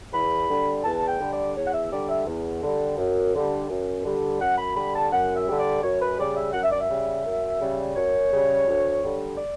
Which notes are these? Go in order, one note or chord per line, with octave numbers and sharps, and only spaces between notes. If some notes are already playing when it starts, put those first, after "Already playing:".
E2 B5
D3 G3
E2 A5
G5
D3 G3
D5
E2 C#5
F#5
E5
D3 G3 D5
E5
E2
D3 G3
F#2
D3 G3
F#2
D3 G3
F#2 F#5
B5
D3 G3 B5
A5
F#2 F#5
E5
D3 G3
D5
F#2 C#5
B4
C#3 G3 D5
E5
F#2 F#5
E5
D5
E5
C#3 G3
F#2
C#3 G3
F#2 C#5
C#3 G3
D2
D3 G3
D5